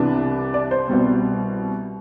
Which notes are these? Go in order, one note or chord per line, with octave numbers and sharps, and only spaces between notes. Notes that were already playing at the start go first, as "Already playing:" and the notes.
Already playing: C2 C3 E3 B3 D4
D5
C5
C2 B2 G3 C4